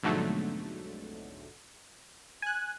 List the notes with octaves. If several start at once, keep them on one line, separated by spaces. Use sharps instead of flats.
B1 F2 G#2 D3 F#3 A3
G#5 F#6